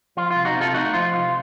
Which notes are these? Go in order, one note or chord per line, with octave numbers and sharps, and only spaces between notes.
F3 F4
C2 F4
D#4 F#4
C3
F4 A4
A3 D#4 F#4
F3 F4
C2 F4